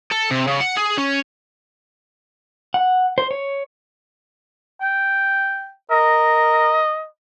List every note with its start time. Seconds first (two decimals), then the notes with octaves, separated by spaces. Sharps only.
0.11 A4
0.31 C3
0.48 C#3
0.61 F#5
0.76 G#4
0.97 C#4
2.74 F#5
3.18 C5
3.31 C#5
4.81 G5
5.91 A#4 D#5